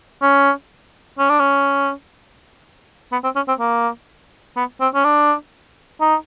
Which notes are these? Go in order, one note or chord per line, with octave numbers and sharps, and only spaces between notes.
C#4
C#4
D4
C#4
B3
C4
C#4
C4
A#3
B3
C4
C#4
D4
D#4